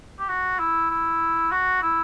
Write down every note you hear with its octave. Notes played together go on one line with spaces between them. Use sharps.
G4
F#4
E4
E4
F#4
E4